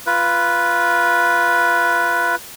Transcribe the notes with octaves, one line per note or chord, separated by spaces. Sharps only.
F4 B4